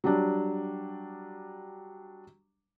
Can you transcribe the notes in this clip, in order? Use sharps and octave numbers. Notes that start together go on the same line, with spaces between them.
F#3 G3 D4